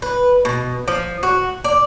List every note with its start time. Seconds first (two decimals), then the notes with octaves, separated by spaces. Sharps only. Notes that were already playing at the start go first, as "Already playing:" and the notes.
0.02 B4
0.45 B2
0.88 F3
1.23 F#4
1.64 D5